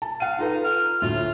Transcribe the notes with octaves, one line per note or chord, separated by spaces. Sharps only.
A5
F5 F#5 D#7
D#4 F4 A4 B4
F6
D2 A2 F4